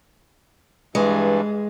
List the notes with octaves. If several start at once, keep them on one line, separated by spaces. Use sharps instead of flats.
G2 E3 G#3